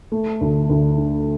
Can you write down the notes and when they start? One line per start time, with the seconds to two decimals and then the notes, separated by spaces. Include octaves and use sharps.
0.12 A3
0.41 D2
0.70 D2
0.98 D3